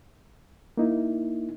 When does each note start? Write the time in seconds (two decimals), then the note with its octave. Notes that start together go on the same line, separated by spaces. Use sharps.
0.77 A#3 D#4 E4